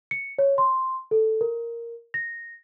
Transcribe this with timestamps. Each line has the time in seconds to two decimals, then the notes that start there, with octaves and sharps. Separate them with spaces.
0.11 C#7
0.39 C#5
0.58 C6
1.11 A4
1.41 A#4
2.14 A#6